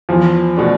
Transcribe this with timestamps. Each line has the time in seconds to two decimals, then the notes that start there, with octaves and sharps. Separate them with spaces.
0.09 E2 F3
0.56 B2 A3 D4